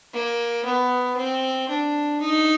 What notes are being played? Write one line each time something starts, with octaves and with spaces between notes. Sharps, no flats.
A#3
B3
C4
D4
D#4